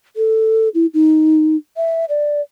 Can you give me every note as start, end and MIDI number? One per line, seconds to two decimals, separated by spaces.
0.16 0.69 69
0.74 0.86 64
0.94 1.56 63
1.77 2.05 76
2.09 2.41 74